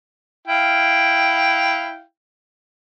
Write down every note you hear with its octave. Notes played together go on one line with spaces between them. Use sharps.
E4 F5 G5